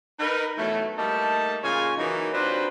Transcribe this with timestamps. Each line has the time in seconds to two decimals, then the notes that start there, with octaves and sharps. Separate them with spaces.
0.19 D#4 A#4 B4
0.57 B2 E3 F#3 A3
0.97 G3 A3 A#3 D#4 A5
1.64 A#2 C#3 F4 C#5 F5 G#5
1.98 E3 F#3 A#3 D#4
2.33 C3 F#3 D4 F4 B4 C5